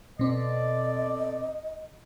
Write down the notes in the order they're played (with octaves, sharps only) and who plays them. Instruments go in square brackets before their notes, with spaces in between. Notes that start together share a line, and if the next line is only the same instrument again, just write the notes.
[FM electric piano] B2 C4 [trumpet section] A4 D5 [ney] D#5